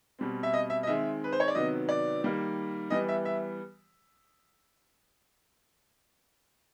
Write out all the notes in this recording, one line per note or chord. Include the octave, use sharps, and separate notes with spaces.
B2 G3 C4
E5
D#5
E5
D#5
D#3 G#3 C4 E5
B4
C5
C#5
D5
C3 D#3 F#3 B3 D#5
D5
D#3 G3 A#3
E3 G3 B3 D#5
E5
E5